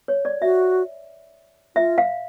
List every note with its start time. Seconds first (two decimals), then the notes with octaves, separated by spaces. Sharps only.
0.08 C#5
0.25 D5
0.42 F#4 E5
1.76 F4 E5
1.98 F5